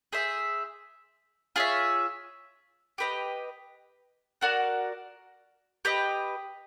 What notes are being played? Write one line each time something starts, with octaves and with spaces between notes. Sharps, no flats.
G#4 C5 E5
F4 G#4 C#5 E5
G4 B4 D#5
F#4 A#4 D5 F#5
G4 B4 D#5